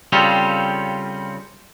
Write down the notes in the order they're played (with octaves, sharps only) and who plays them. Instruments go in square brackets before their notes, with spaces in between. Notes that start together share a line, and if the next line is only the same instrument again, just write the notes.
[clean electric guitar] C#3 G3 C4 C#4 F4 A4